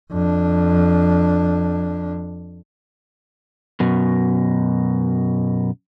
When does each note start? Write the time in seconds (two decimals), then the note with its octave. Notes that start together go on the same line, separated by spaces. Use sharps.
0.11 F2 D4
3.80 F#2 B2